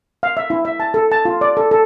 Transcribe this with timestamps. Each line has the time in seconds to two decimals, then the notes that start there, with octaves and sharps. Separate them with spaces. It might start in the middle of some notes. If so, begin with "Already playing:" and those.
0.23 F5
0.37 E5
0.50 E4
0.65 E5
0.80 A5
0.94 A4
1.12 A5
1.25 F4
1.41 D5
1.57 A4
1.71 A4